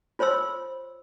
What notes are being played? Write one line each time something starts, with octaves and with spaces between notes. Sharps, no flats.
F4 C5 C#5 C6 E6